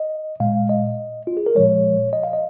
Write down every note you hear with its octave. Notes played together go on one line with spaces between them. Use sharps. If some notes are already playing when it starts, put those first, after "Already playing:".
Already playing: D#5
A#2 G#3 F5
D#5
F4
G#4
A#4
A#2 F3 G#3 C#5
D#5
F5
D#5